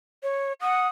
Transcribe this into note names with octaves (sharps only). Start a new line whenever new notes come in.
C#5
F#5 D#6